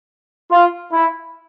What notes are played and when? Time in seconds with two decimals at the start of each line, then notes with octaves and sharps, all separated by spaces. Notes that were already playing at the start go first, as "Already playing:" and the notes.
0.51 F4
0.92 E4